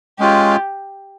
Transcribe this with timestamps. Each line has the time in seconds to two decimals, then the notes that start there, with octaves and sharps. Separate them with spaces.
0.19 G#3 C#4 F4 G4